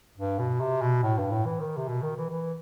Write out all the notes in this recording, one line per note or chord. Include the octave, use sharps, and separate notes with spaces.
G2
B2
C3
B2
A2
G2
A2
E3
D#3
C3
B2
D#3
E3
E3